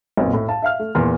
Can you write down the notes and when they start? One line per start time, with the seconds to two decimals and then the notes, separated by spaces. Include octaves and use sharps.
0.17 B1 F2 A#2
0.33 A2
0.49 F5 A5
0.62 E5 F5 F6
0.79 A3
0.95 E2 A#2 C6 F6